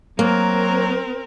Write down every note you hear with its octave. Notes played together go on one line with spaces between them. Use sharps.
F#3 A#3 C4 A#4